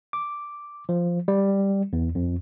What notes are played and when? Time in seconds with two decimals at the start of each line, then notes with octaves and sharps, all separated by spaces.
0.13 D6
0.89 F3
1.28 G3
1.93 E2
2.15 F2